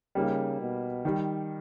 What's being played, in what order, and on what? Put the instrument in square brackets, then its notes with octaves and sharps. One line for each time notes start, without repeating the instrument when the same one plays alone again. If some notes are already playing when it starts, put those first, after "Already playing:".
[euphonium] C#3 [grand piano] G3 A#3 D#4
[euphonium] B2
[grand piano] D#3 G3